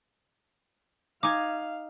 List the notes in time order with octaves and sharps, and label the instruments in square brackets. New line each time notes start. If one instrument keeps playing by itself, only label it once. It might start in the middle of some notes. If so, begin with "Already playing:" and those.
[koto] D#4 G#5 [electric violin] F5 [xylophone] D6